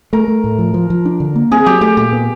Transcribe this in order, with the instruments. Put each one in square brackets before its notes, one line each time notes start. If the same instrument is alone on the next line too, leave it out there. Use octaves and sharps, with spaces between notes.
[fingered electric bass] A3 [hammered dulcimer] A#4
[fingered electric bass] A3
A2
F3
F3
F3
D4
D3
A#3
[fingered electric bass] C4 [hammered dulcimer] G#4
[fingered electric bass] F#3 [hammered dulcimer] G4
[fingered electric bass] A3 [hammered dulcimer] G4
[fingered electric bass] A#2 [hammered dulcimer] G4
[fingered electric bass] B3